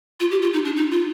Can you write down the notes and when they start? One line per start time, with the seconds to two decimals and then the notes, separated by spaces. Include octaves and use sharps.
0.20 F4
0.31 G4
0.42 F4
0.53 D#4
0.65 D4
0.76 D#4
0.92 F4